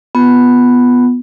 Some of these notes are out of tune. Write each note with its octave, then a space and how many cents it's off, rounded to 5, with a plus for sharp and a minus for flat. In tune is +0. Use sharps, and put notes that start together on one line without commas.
B3 +0 F4 +0